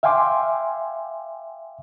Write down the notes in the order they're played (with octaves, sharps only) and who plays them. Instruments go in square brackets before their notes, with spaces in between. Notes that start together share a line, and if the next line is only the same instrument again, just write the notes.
[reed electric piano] E5 F5 G5 G#5 C6 D6